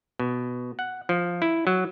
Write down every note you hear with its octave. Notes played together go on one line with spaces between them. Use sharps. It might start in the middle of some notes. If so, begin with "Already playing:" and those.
B2
F#5
F3
E4
F#3